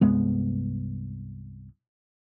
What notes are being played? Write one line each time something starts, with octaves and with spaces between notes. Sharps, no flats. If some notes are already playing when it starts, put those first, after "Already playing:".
C2 G2 G#3 B3